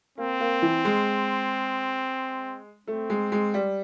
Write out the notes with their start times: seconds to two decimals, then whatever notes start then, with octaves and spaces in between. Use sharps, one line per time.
0.18 A#3 C4
0.40 A#3
0.62 E3
0.85 G#3
2.87 A3 C4
3.10 G#3
3.32 G#3
3.54 G3